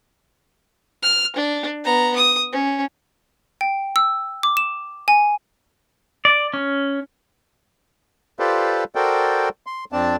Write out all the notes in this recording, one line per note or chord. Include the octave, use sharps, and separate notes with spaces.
F6
D4
B3 A#5
D#6
C#4
G5
E6
D6
E7
G#5
D5
C#4
F4 G4 A4 B4 C5 D5
F#4 A4 A#4 C5 D5 G5
C6
F2 C4 D4 D5 A5